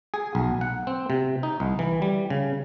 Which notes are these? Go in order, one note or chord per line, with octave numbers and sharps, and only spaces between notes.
G#4
B1
F#5
C4
C3
D#4
C2
E3
G3
C#3